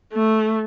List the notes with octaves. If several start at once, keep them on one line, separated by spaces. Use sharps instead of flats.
A3